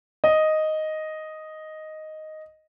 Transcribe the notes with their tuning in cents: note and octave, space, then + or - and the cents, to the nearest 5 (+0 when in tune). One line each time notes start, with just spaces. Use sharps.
D#5 +0